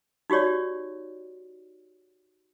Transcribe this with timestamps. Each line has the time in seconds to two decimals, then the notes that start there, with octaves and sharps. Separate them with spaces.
0.30 D#4 F#4 G4 C#5 D5